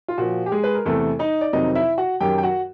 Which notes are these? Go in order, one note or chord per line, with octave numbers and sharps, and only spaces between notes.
F4
A#2 F3 F#4
G4
G#3 G#4
B4
A#4
E2 C3 E3 A3 A4
D#4 D#5
D5
F2 C3 D#3 F#3 D#4 D#5
E4 E5
F#4 F#5
F#2 D#3 F#3 G4 G5
G5
F#4 F#5